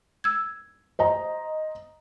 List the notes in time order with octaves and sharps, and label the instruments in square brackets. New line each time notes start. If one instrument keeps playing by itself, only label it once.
[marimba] E6 G#6
[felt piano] C5 D#5 A#5